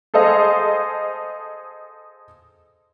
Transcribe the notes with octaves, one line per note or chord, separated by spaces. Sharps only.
G#4 A4 C5 D#5 F5